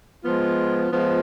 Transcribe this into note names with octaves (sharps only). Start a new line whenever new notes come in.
F3 G#3 B3 F4
F3 G#3 B3 F4